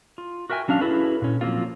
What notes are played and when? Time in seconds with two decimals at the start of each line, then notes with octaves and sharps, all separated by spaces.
0.18 F4
0.50 F#4 A#4 E5 G5 G#5
0.68 F#3 C#4 D4 F5
0.81 C#4 E4 F#4 G#4 A4 B4
1.22 A#2 C#4
1.41 F3 F#3 G#3 A#3 C4 F4